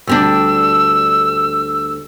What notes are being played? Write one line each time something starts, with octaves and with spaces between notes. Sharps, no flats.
D2 G3 D4 E6